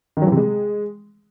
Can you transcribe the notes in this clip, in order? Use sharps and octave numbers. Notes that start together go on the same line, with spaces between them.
D#3
F#3
E3
C3
G#3